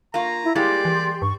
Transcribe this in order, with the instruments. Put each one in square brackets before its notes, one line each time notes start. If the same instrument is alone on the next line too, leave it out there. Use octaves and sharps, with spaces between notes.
[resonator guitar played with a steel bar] A#3 F4 [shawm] A#5
[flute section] E4
[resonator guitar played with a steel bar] G3 G#3 A#3 [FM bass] E4 [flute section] G4 C6 [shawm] D5
[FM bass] E3
[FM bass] G2 [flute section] C#6